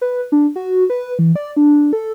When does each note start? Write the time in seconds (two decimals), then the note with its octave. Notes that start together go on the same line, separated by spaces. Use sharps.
0.01 B4
0.32 D4
0.56 F#4
0.90 B4
1.19 E3
1.36 D5
1.57 D4
1.93 A4